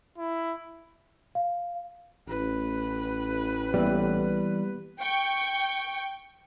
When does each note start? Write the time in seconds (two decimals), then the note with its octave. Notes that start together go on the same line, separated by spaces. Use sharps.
0.18 E4
1.35 F5
2.29 A1 B4
3.74 E3 G3 A#3 B3 G4
4.98 G5 C#6